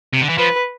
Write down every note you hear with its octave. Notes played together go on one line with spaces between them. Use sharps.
C3
D3
E3
F3 B4